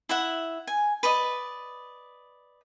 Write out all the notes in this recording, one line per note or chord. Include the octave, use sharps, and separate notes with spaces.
E4 E5 F#5
G#5
B4 D5 D#5